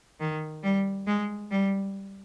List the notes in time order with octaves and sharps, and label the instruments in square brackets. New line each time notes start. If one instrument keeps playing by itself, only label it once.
[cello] D#3
G3
G#3
G3